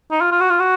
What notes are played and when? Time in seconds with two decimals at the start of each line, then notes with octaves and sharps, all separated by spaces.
0.11 D#4
0.21 F4
0.31 F4
0.41 F#4
0.50 F4
0.60 F#4